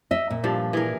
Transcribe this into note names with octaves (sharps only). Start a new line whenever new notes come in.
D#5 E5
A#2
G2 F3 D4
E3 G#4 A#4